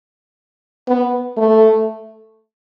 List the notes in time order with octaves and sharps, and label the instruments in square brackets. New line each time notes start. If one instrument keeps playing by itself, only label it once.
[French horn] B3
A3